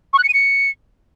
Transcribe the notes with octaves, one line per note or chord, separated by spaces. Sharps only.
C#6
F#6
C#7
D#7
C#7